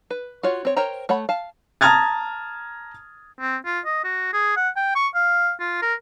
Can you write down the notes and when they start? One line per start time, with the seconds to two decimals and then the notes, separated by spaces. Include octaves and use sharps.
0.11 B4
0.43 F4 F#4 C#5 F#5
0.65 C4 C#5
0.77 A#4 C5 C#5 G5 A#5
1.09 A3 C#5 F#5 B5
1.29 F5 A5
1.81 A5 A#5 D#6 F6 G#6 A6
3.41 C4
3.66 F4
3.85 D#5
4.04 F#4
4.33 G#4
4.57 F#5
4.77 G5
4.95 C#6
5.15 F5
5.60 F4
5.82 A#4